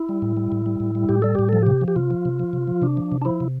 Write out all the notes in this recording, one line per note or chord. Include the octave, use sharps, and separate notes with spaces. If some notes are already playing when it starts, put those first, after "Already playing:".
Already playing: E4
G3
A2
G3
A2
G3
A2
G3
A2 G4
G3 A4
A2 G4
F3 A4
C3 G4
F3
G4
C3 F4
F3
C3
F3
C3
F3
C3 D4
F3
C3
D4
F3 E4
C3